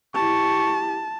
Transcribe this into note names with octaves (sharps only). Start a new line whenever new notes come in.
E4 G4 A5 C#6